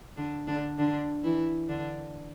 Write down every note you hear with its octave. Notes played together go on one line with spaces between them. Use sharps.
D3 D4
D3 D4
D3 D4
E3 E4
D3 D4